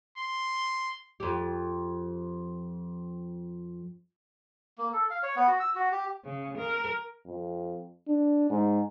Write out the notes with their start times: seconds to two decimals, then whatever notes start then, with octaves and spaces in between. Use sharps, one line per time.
0.18 C6
1.20 F2 G4
4.78 A#3
4.93 A4
5.10 F5
5.23 C#5
5.36 B3
5.48 F#4
5.60 E6
5.75 F#4
5.92 G4
6.23 C#3
6.57 A#4
7.26 F2
8.08 D4
8.51 G#2